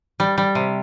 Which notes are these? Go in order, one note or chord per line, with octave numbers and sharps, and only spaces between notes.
G3
G3
C3